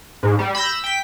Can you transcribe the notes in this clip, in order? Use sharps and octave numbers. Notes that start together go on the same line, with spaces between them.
G#2
G3
B5 E6 G6 A#6
E6
G5 B6